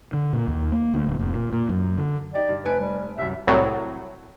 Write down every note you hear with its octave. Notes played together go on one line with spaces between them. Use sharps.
D3
A#2
D#2
A#3
D2
D1
F1
A#2
A#2
F#2
D3
D#4 G4 D5
G2
F1 B4 G#5 D7
G3
C2 F#2 E5
C2 A2 F#3